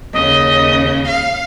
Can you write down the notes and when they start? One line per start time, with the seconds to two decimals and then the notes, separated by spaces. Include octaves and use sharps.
0.13 D#2 C#3 D#5
1.08 F5